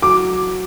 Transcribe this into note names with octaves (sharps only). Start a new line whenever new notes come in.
F#3 D6